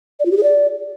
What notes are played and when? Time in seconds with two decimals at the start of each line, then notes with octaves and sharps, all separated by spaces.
0.20 D5
0.25 F4
0.31 G4
0.37 G#4
0.43 D5